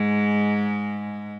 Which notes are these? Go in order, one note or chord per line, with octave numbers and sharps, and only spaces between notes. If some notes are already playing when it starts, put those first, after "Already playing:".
Already playing: G#2 G#3